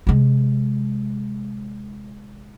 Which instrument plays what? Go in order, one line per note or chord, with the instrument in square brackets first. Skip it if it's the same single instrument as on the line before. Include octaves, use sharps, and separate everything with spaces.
[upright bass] C3 G#3